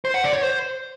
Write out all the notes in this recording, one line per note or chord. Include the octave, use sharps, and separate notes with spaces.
C5
F#5
D5
C#5
C5